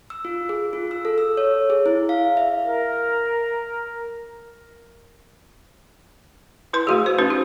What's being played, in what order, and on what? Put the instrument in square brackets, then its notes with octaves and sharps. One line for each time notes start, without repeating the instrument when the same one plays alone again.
[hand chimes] E6
F4
G#4
F4
E6
A4
E6
C#5
G#4
E4
F5
E5
[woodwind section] A#4
[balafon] E4 B4 C6
A3 F#4 G#4
C5
C#4 D#4 F#4 B4
G4